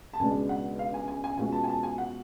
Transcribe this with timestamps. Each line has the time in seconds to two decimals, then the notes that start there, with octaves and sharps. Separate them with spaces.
0.13 A5
0.19 C#2 B2 G#3 D4 G#5
0.49 F#5
0.79 F5
0.94 G#5
1.08 G#5
1.24 G#5
1.37 B2 G#3 C#4 F4 G#5
1.52 A5
1.64 G#5
1.68 A5
1.83 G#5
1.98 F#5